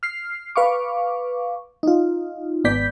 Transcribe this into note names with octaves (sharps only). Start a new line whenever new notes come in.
F6 C7
B4 F5 C#6 D6
D#4 F4
G#1 B3 D5 G6 B6